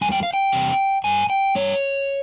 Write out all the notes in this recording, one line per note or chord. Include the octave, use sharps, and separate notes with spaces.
E2 C3 G3 G#5
G5
F5
G5
E2 C3 G3
G2 G3 G#5
G5
G2 G3 C#5